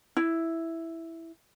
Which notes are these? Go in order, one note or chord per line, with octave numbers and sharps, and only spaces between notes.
E4